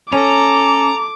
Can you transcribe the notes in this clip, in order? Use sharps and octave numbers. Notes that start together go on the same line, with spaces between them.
C#4 A4 A#5 D6